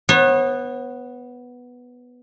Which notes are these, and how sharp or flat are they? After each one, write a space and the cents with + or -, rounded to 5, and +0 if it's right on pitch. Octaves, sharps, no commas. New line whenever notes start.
B3 +0 C#5 -40